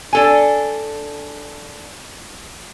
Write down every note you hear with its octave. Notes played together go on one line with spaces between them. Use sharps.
D4 A4 G#5